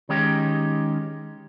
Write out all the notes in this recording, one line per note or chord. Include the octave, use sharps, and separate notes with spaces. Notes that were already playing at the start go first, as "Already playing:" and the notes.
D#3 G#3 C#4 D#4 G4